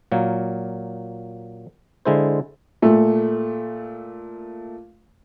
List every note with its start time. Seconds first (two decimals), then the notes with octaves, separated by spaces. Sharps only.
0.12 A#2 F#3 A#3
2.05 D3 G#3 E4 C5
2.82 A#2 A3